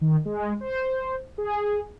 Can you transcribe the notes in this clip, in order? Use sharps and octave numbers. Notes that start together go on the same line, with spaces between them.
D#3
G#3
C5
G#4